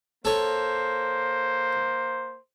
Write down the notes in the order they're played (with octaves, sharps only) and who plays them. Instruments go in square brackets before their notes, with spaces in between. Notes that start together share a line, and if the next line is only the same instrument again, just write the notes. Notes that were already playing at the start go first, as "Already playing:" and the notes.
[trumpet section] A#3 C5 [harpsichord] A4 C#5